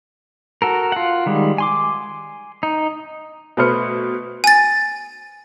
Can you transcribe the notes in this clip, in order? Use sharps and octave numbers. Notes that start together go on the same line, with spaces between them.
F#4 A4 A#4
F4 F#5
D#3 G3 G#3
G#5 C6 D6
D#4
B2 A3 B4 C5 F6 C#7
G#5 A6